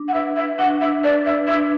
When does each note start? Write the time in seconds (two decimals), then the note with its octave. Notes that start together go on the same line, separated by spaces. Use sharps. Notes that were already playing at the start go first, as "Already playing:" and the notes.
Already playing: D4
0.08 F#5
0.14 B4 E5
0.36 E5
0.59 D4 F#5
0.81 E5
1.03 B4 D5
1.26 E5
1.47 D4 E5